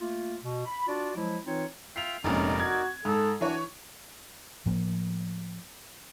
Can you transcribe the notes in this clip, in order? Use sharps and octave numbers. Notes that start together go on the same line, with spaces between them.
A3 A#3 F4
B2
B5
D4 F4 F#4 D5
F3 F#3 G#3 E4
E3 C4 D#4 F4 C#5
F4 E5 G5 C7 F7
F1 A#1 G#2 C#4 D#4 A#4 D5
F#4 G#6
G#2 G#4 A4
E3 D4 F#4 C#5 G#5
A2 F3 A#3